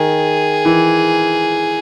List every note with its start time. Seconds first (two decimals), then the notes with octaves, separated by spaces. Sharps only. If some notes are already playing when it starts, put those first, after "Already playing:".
Already playing: D#3 G#4
0.65 E3